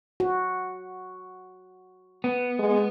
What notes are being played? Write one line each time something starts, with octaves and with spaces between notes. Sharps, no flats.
F#4
B3
G#3